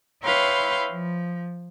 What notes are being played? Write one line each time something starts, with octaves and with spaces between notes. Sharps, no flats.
E4 B4 C#5 F5 G5 C6
F3